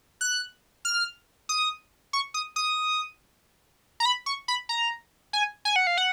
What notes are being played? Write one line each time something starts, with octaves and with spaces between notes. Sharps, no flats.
F#6
F6
D#6
C#6
D#6
D#6
A#5
B5
C#6
B5
A#5
G#5
G#5
F#5
F5
F#5